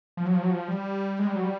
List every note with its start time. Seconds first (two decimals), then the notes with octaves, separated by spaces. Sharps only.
0.17 F3
0.25 F#3
0.34 F3
0.42 F#3
0.51 F3
0.68 G3
1.19 G#3
1.27 G3
1.36 F#3
1.43 G3